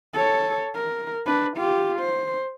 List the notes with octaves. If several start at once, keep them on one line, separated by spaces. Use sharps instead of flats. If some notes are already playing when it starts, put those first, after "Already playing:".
A4 C#5
A#4
D4 B4
F4 G4
C5